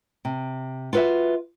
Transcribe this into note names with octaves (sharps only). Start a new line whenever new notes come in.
C3
F4 F#4 B4 D#5 E5